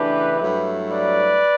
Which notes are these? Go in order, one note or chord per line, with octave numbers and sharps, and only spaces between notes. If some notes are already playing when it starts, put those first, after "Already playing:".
Already playing: C#3 E3 A3 D4 G4 B4
G2 F#3 A3 E4
B4 D5